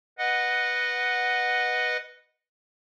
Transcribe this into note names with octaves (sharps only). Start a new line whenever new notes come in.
B4 D#5 F#5